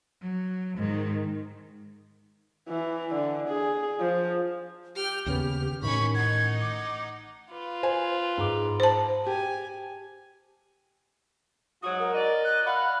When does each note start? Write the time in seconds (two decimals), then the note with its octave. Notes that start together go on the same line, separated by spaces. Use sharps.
0.21 F#3
0.76 G#2 D#3
2.69 E3
3.15 D3
3.48 G#4
4.00 F3
4.96 G4 G5 F6
5.26 D#2 C#3 B3 F6
5.82 A1 A2 D#3 C#4 B5 C#6
6.15 D#4 F#5 G#6
6.61 D6
7.52 F4 B4
7.83 C5 G#5
8.38 G#2 D6
8.80 C5 A5
9.27 G4 G#5
11.83 G#2 F#3 F#4 D#6
11.99 A#4
12.14 D5 D#5
12.45 F#6
12.66 F5 F#5 B5